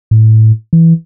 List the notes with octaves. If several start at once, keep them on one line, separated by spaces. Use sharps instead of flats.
A2
E3